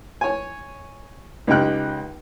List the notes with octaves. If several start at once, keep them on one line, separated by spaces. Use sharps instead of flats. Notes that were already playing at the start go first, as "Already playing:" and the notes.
C#5 G#5
C#2 D#4 G4 G5 F#6